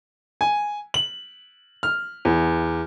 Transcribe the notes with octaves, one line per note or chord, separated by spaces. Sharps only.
G#5
F#7
F6
E2